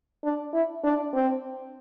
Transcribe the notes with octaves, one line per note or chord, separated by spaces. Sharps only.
D4
E4
D4
C4